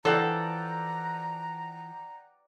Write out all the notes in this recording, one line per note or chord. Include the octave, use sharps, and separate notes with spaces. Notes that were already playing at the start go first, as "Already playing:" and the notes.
E3 F3 A4 D5 F#5 G5 A#5